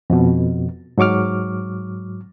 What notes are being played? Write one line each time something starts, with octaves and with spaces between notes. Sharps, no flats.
F2 B2
G#2 F#3 C#6 D6 F6